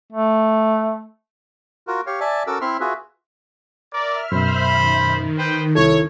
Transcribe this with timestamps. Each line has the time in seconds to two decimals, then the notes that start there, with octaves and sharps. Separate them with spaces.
0.12 A3
1.88 F4 F#4 A#4
2.07 G4 C#5 F5
2.20 D5 E5 G#5 A5
2.47 C#4 F#4 A4 A#4 D6 E6
2.61 C4 E4 E5 C6 F6
2.80 F4 F#4 G#4 B4 E5
3.93 A#4 D5 E5 F6
4.32 F#2 B2 C5 B5
4.67 D#3
5.38 B4 C5 G5
5.75 C2 E4 A4 C#5